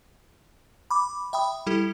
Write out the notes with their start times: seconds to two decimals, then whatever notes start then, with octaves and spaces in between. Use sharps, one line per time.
0.91 B5 D6
1.33 E5 G5 B5 D#6
1.67 G3 E4 G4 A4